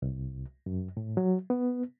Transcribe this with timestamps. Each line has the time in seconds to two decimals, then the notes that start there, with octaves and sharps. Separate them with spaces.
0.02 C2
0.66 F#2
0.97 A2
1.17 F#3
1.50 B3